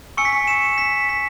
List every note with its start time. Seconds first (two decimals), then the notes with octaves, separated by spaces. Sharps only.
0.17 G#5 C#6 E6 C#7
0.25 B6
0.32 C#7
0.47 E7
0.78 B6
1.09 B6